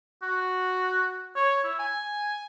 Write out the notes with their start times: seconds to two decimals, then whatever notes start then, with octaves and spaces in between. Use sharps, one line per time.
0.23 F#4
1.36 C#5
1.64 E4
1.79 G#5